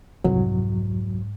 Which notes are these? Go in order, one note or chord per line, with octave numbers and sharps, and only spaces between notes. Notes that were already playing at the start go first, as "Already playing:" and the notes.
C2 F2 G#2 F#3